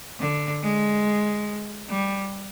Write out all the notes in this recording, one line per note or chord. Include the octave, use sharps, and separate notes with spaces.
D3
G#3
G3